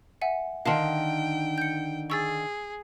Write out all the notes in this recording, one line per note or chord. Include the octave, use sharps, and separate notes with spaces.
E5 F#5 G#5
D3 D#3 F5 G5 A5 C6
G6 C#7
G#4 C#6 E6 A6